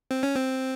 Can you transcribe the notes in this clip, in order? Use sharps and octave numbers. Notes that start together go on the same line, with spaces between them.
C4
C#4
C4